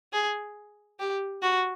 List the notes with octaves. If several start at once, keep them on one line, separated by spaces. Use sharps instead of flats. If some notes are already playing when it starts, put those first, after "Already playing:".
G#4
G4
F#4